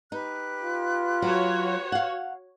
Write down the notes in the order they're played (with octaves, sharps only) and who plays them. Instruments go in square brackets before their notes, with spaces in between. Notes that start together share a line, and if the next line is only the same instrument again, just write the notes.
[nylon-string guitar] D#4 [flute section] G4 B4 F#6
[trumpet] F4
[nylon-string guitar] F#3 [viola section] F#4 C#5
[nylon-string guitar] F5 F#5